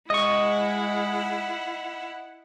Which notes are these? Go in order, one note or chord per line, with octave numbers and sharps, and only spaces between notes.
G#3 E4 D#5 F#5 C#6